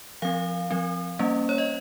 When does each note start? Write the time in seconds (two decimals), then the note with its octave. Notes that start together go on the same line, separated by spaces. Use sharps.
0.22 F3 C4 F5
0.71 F3 C4
1.19 G3 A#3 C#4
1.49 C#5
1.58 D#5